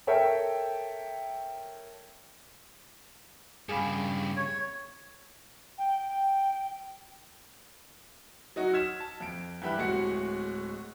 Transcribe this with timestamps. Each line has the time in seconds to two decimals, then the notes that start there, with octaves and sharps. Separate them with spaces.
0.07 A4 A#4 C#5 E5 G5
3.69 G2 C#3 G#4 F5 B5
4.37 C#5
5.78 G5
6.09 G5
8.56 F#3 D#4 F#4
8.73 E6 F6 G#6 B6 E7
9.00 A5
9.20 F2 D7
9.62 G2 E3 G4 E5 B5 F#6
9.77 D1 A2 G#3 F#4 C#7